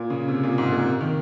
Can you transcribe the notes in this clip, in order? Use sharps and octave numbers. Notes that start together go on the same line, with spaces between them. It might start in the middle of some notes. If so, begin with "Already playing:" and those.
Already playing: A#2
C#3
C3
A#2
G#2
A#2
C3
D#3